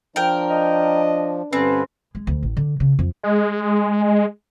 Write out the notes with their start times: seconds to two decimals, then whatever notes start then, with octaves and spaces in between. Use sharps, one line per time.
0.16 F3 D4 A#4 G5
0.51 D#5
1.53 G2 D3 C4 C#4 B4
2.15 G#3
2.27 D2
2.43 A1
2.57 D3
2.80 C#3
2.99 F2
3.23 G#3